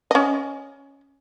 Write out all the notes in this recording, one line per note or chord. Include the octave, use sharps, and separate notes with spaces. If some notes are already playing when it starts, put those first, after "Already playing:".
C#4 D#5